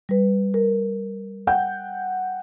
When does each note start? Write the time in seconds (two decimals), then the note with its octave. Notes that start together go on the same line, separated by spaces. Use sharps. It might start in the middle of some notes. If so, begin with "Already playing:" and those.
0.09 G3 B4
0.54 A#4
1.47 F#5 G5 G6